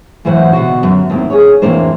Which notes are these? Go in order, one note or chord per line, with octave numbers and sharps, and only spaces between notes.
F#2 A2 E3 C5 F#5
B2 D3 F#4
F#2 D3
D#2 A2 C4
G#4 C#5
F2 A2 E3 A#3 D4 C5